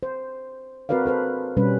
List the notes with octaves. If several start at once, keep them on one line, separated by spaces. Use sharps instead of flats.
C5
C4 F#4 A#4 B4 D5 F5
A4 B4 C5
B2 G3 C#4 B4